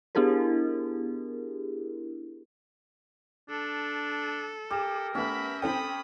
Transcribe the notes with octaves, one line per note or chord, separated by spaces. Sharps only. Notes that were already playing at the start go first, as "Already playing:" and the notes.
B3 D4 E4 G4 G#4 A#4
D4 A4
G4 A#4 D6 E7
A3 B3 C#4 E5 B5
C4 A4 G5 B5 D#6